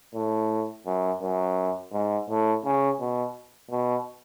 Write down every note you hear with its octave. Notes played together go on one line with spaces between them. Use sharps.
A2
F#2
F#2
G#2
A2
C#3
B2
B2